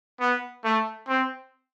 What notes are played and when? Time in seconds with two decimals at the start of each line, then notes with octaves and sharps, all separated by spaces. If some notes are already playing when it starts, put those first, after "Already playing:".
0.20 B3
0.64 A3
1.08 C4